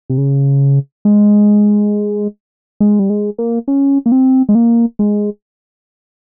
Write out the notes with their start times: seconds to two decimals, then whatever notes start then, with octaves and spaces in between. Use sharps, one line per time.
0.10 C3
0.18 C#3
1.05 G#3
2.80 G#3
2.99 G3
3.10 G#3
3.38 A#3
3.68 C#4
4.06 A#3
4.12 C4
4.49 G#3
4.55 A#3
4.99 G#3